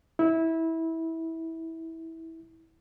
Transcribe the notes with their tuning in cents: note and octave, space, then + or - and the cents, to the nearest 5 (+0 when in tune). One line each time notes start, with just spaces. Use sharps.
E4 -20